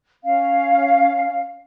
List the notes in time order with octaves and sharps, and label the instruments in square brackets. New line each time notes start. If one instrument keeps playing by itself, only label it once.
[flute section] C#4 F5